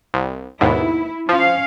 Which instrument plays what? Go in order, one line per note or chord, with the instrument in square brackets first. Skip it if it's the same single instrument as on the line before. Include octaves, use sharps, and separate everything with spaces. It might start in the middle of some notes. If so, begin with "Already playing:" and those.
[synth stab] C2
[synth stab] D#2 G#2 B2 [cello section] E4
[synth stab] F3 [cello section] C#4 F5